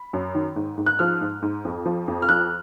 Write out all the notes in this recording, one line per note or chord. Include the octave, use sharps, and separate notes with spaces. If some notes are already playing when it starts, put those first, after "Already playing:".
Already playing: B5
F#2
D#3
G#2
G#2
F#6
F3 F6
G#2
G#2
F2
F3
F2
F6
F3 F#6